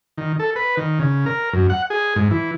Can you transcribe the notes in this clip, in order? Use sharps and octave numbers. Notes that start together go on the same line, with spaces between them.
D#3
A4
B4
D#3
C#3
A#4
F#2
F#5
G#4
G#2
E3